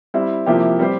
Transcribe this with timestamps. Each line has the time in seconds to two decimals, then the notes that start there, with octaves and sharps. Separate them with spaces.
0.14 G3 C4 E4
0.47 C3 F3 A#3 E4 G4
0.79 G3 C4 G4 C5